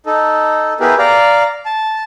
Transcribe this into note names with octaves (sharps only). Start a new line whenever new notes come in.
D#4 A4
B3 E4 G4 G#4 A#4 B4
D5 F5 A#5
A5